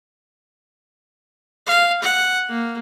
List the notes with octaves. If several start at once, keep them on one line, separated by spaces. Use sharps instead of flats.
F5
F#5
A#3